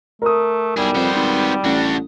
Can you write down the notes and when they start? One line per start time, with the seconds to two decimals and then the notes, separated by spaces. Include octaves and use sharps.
0.22 A3 A#4 D#6
0.77 B1 G3 E4 G#4
0.95 F2 B3 C5
1.15 G#1
1.65 A1 D4 F#4